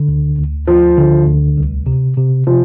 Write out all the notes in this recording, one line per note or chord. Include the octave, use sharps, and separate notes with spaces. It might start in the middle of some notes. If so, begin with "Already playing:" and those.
Already playing: D3
D2
D2
D2 F3
D3
D2
C2
C3
C3
C3 F3